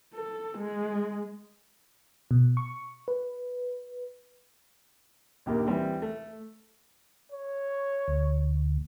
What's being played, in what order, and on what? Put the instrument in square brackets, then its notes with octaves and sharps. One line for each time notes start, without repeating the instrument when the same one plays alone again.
[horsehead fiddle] A4
G#3
[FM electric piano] B2
C#6
B4
[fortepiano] A#1 D#2 A#3 G4
E3 G3 C4
A3
[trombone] C#5
[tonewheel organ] D2